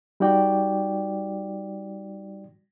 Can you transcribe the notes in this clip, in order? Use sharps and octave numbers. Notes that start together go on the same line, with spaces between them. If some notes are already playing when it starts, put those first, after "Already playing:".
G3 D#4 F#4 D5 G5